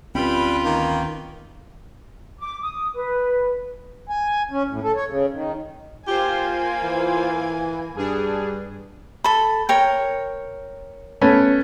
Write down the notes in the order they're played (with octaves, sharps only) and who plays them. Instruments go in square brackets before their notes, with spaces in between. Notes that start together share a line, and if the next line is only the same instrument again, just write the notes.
[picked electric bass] D2 C4 C#4 [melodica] G3 G5 B5 [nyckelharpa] F4 B4
[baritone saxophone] D#3 [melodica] A#3
[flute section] D6
D#6
B4
[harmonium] G#5
C#4
A2
A4
C#5
C#3
D#3
[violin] A#3 G#5 [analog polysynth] F4 C5 [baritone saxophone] G4
[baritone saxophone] E3
[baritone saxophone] G2 [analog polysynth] D4 G#4
[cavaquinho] A4 B5
A#4 C#5 G5
[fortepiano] A3 B3 C#4